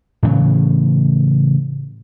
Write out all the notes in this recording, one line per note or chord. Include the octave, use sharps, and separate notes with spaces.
A2 C#3 E3 F#3